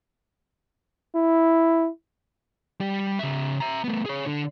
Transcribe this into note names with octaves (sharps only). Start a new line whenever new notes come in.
E4
G3 G4
C#3 E5
E5 A#5
A3 B3
G#4 C#5
D3